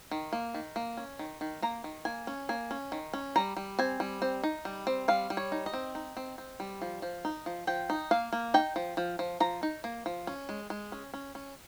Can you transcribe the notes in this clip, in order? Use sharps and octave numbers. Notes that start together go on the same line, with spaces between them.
D#3
A#3
D#3
A#3
C#4
D#3
D#3
A#3 A#5
D#3
A#3 G#5
C#4
A#3 G#5
C#4
D#3
C#4
G3 A#5
G3
C4 G#5
G3
C4
D#4
G3
C4
G3 F5
G3
C#5
D#4
D#5
C4
D#4
C4
C4
G3
F3
F3
D#4
F3
F3 G5
D#4
A#3 F5
A#3
D#4 G5
F3
F3
F3
F3 A#5
D#4
A#3
F3
C#4
G#3
G#3
C#4
C#4
C#4